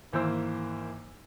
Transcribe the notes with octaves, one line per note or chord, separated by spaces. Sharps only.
G#1 E3 A#3 C5 E6